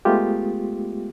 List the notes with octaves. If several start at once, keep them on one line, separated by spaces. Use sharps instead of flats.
G#3 A3 B3 F4 G4